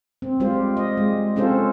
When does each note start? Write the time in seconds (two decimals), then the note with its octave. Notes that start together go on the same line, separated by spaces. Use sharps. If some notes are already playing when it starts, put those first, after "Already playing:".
0.22 C4
0.40 G3 G#3 F4 G4 C5
0.77 D#5
0.97 G#3
1.36 C4 C#4 F4 G4 A4 C5